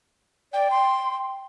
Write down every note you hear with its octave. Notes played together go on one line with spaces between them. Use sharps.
D5 G5
C6